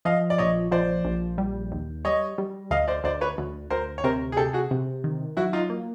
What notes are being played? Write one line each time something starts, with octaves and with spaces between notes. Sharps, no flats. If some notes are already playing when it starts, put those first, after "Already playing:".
F3 D#5 F5
D5
A#1 C#5 D#5
F3 C5 D5
A#1
G3
D#2
G3 C#5 D#5
G3
D2 D#5 F5
C5 D5
D2 C5 D5
B4 C#5
D2
D2 A#4 C5
C#5
C3 A#4 C5
G#4
C3 G4 A4
F#4 G#4
C3
D#3
F#3 E4 F#4
D#4 F4
A#3